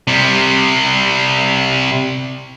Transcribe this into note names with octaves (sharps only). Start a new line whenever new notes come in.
C3 G3